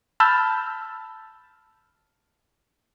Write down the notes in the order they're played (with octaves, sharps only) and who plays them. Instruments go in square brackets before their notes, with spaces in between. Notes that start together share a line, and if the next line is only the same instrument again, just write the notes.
[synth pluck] A5 B5 E6 F6 G6 A6